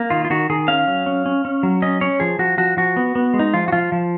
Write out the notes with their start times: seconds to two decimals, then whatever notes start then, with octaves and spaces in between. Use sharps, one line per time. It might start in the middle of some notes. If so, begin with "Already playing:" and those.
Already playing: A#3
0.10 D#3 F4
0.25 F4
0.30 D#3 F#4
0.50 D#3 G#4
0.68 C#4 F5
0.88 F#3
1.06 C#4
1.26 C#4
1.45 C#4
1.63 F#3
1.82 C#4 D#5
2.01 C#4 C#5
2.20 F3 G#4
2.39 F3 F#4
2.58 F3 F#4
2.77 F3 F#4
2.96 B3
3.15 B3
3.34 G#3
3.39 D#4
3.54 F3 F4
3.68 F#4
3.72 F3 F4
3.92 F3